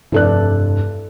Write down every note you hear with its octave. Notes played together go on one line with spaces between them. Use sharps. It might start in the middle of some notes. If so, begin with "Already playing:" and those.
F1 G2 E4 A4 D5 F#6